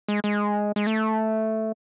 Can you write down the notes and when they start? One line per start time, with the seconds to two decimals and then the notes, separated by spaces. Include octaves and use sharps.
0.08 G#3
0.24 G#3
0.76 G#3
0.87 A3